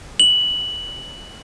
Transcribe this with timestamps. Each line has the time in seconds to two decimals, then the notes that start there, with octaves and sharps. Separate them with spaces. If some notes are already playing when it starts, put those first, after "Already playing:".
0.20 F#7